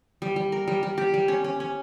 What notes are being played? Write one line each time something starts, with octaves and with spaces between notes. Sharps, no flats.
G3
G3
A#4
G3
G3
G4
G3
C#4
C#4
C#4